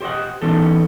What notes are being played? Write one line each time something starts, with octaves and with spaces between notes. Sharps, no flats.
G4 C5 C#5 D#5 F#5
E3 B3 C#4 D#4 A4